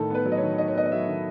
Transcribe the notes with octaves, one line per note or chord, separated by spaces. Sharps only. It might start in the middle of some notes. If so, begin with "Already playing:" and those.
Already playing: A2 D#3 A4
B3 B4
F#3
D#5
C#5
D#3
D#3 D#5
C#5
B3 D#5
D#5
F#3 E5
D#3